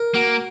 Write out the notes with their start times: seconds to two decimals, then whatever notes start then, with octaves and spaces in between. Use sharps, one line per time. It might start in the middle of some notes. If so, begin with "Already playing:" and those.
Already playing: A#4
0.14 A#3 F#4